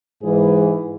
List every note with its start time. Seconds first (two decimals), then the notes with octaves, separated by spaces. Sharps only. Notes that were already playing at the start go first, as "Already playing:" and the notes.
0.22 G#2 E3 G#3 G#4 B4